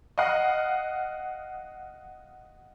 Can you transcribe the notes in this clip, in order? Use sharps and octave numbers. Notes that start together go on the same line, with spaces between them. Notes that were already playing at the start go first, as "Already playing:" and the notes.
D#5 F5 F#5